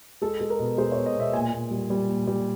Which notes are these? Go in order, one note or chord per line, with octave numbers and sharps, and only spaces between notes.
G#3 A4
G#3
A#4
B2
G#3 C5
C#5
B2
D#5
B2 E5
A#2 G#5
A#2
G3
G3
A#2
G3